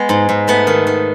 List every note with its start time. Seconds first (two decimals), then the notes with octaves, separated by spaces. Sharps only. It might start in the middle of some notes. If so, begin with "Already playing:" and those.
Already playing: G#3 B3
0.09 G#2
0.29 G#2
0.48 A3 B3
0.67 D#3
0.87 D#3